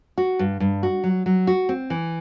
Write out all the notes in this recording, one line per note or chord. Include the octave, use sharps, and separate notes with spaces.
F#4
G2
G2
F#4
F#3
F#3
F#4
C4
E3